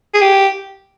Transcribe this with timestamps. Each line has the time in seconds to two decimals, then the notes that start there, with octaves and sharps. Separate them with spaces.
0.14 G#4
0.21 G4